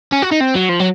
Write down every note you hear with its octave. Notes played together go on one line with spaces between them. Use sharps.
C#4
F#4
D#4
C4
F#3
F3
F#3